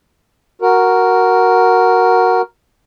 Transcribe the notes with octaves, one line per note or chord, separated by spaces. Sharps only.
F#4 A#4